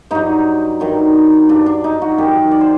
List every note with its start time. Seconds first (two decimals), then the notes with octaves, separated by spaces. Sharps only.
0.11 G2 F#3 D#4
0.80 G2 D#3 F#3
1.49 G2 F#3 D4
1.66 D4
1.84 D#4
2.02 F#4
2.18 F#2 D#3 F#3 G4
2.51 D5
2.61 C5